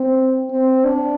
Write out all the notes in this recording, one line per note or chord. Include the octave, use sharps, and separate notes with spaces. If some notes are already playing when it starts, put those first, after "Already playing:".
Already playing: C4
C4
D4